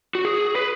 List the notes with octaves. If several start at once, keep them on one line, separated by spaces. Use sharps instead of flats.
F#4
G#4
B4